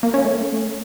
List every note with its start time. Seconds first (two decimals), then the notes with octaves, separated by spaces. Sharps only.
0.03 A#3
0.14 C#4
0.25 A3